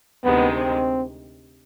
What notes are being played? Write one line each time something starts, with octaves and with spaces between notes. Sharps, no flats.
D2 C3 D#3 G#3 B3
C4